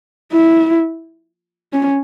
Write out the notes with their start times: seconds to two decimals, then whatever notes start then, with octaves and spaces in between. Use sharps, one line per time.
0.33 E4
1.73 C#4